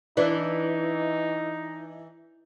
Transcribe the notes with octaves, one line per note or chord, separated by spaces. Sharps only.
E3 D4 D#4